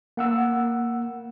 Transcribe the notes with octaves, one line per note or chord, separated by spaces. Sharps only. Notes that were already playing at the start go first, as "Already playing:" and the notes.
A#3 F#5 E6